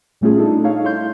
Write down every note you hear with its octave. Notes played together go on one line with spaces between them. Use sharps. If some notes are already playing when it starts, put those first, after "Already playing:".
A#2 G3 A3 C#4 F4 G#4
D4 D#4 A4
D#4 A4 C#5 F5
E4 C#5 C6 G6